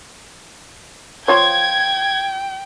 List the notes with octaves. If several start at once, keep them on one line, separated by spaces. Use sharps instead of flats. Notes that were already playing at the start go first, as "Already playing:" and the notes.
F3 F4 C#5 G5 G#6